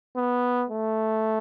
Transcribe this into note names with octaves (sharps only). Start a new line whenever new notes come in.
B3
A3